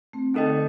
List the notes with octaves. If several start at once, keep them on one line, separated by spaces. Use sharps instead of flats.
A3 C4
D3 C4 D#4 A4 D#5 G5
D3